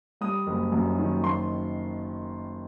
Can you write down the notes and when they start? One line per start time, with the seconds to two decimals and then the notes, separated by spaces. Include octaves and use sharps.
0.21 G3 D#6
0.47 F#1
0.72 F#2
0.98 D#3
1.23 F#1 C6